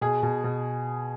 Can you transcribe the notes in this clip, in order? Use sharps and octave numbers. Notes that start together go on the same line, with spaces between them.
B2 G#4
B2
B2